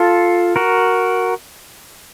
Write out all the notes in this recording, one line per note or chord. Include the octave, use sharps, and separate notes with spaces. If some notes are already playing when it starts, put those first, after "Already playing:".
Already playing: F4 A4
F#4 A#4